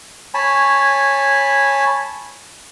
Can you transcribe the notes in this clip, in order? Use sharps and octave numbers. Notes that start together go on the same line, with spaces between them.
C#5 G#5 A5 B5